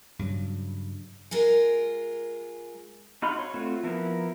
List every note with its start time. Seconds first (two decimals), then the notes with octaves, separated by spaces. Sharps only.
0.19 G2 C#3 F#3
1.31 G#3 F4 A#4
3.22 D#4 F#4 F5 B5 C6
3.39 C#5
3.54 A3 C4 F4 F#4
3.83 F3 B3 E4 A#4